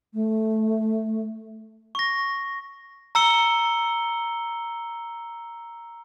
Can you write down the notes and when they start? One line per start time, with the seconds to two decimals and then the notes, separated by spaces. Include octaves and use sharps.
0.14 A3
1.95 C#6 A#6
3.15 A#5 E6 C#7 G7